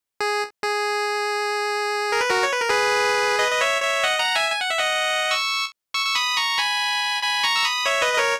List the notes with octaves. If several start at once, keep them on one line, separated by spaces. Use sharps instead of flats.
G#4
G#4
A#4
B4
F#4 A#4
C#5
B4
A#4
G#4 B4
B4 D#5
D#5
C#5 E5
C#5 E5
D#5 F#5
F#5 A#5
E5 G#5
G#5
F#5
E5
D#5 F#5
C#6 E6
C#6 E6
E6
B5 D#6
A#5 C#6
G#5 B5
G#5 B5
A#5 C#6
E6
B5 D#6
C#5 E5
B4 D#5
D#5
A#4 C#5